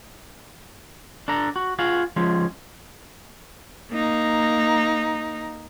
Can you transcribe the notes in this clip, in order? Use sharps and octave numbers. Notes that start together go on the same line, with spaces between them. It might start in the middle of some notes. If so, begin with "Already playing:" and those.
D4 A4 A#5
F#4
F4 F#4 G#4
F3 G#3 C#4
A#3 D#4